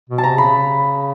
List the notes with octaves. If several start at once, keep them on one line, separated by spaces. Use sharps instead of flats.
B2
A5
C3 A#5
C#3 B5